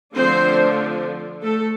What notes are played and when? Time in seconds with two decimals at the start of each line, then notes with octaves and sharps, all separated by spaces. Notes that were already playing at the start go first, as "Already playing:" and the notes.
0.16 D3 F3 A3 C4 D4 C5
1.43 A3 A4